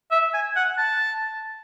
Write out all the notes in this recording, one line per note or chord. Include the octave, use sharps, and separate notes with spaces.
E5
G#5
F#5
A5